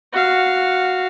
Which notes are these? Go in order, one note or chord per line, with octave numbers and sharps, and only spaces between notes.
F#4 F5